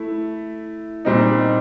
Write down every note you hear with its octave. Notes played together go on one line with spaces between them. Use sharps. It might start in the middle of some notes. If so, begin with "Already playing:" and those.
Already playing: A3 E4
A#2 G3 C4 D#4